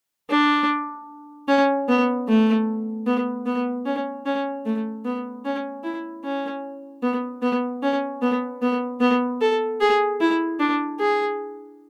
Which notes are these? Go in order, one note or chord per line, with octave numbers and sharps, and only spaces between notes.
D4
C#4
B3
A3
B3
B3
C#4
C#4
A3
B3
C#4
E4
C#4
B3
B3
C#4
B3
B3
B3
A4
G#4
E4
D4
G#4